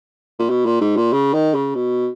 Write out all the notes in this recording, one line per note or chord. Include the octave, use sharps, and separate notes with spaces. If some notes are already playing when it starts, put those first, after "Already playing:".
A#2
B2
A#2
G#2
A#2
C#3
D#3
C#3
B2